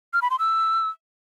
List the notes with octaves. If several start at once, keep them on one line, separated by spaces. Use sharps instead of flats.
F6
B5
C6
E6